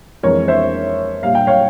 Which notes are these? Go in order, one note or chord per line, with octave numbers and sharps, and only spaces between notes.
F2 E3 G#3 A#4 C#5
C5 E5
A#2 G3 F5
G5
C#5 F5